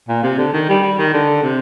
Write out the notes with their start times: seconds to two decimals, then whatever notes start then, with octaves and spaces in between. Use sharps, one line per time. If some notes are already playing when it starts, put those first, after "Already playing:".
0.09 A#2
0.23 C3
0.38 D3
0.53 D#3
0.69 G3
0.83 G3
0.99 D#3
1.13 D3
1.42 C3